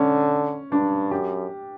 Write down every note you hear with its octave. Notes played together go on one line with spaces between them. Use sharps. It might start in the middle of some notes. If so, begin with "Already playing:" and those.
Already playing: D3 C#4
G2 D4
F#2 G4